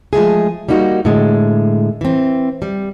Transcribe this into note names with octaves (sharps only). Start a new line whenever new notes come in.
F3 G#3 A3 G#4
G3 A#3 D#4 F#4
A2 D3 G#3
E3 C4
G3